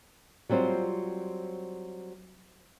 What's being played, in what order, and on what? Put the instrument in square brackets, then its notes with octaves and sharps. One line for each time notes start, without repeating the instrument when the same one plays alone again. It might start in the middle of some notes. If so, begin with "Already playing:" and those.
[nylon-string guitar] F#3 G3 C4 F4 C5